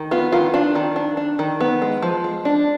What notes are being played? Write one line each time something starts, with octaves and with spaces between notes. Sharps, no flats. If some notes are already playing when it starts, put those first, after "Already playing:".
Already playing: D#3
B3 F4
D#3 F4
D4 F4
D#3
D4
D4
D#3
B3
G#3
F3
G#3
D4